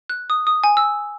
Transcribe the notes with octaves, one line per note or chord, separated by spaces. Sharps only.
F#6
D#6
D#6
G#5
E6